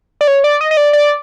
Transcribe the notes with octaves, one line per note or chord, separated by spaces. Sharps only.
D5
C#5
D5
D#5
D#5
D5
D5